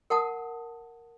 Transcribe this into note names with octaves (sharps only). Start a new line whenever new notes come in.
A#4 F#5 A5 D#6